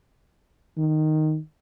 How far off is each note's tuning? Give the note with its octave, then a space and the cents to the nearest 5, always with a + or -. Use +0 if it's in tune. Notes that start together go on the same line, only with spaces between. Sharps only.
D#3 -5